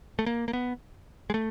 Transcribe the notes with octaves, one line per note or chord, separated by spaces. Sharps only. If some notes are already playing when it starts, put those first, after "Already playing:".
A3
A#3
A#3
B3
G#3
A3